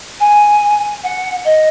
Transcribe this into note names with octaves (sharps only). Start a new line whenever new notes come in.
G#5
F#5
D#5